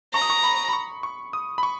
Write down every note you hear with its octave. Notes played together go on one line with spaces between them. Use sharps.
A#5 C#6
D#6
C#6
B5
B5
C#6
C#6
D#6
B5
C#6